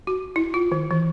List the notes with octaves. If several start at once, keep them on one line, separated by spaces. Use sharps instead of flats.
F#4
E4
F4
D#3
E3